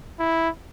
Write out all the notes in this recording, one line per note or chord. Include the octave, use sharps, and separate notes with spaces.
E4